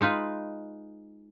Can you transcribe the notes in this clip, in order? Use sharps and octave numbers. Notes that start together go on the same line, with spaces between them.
G#3 D#4 F4 B4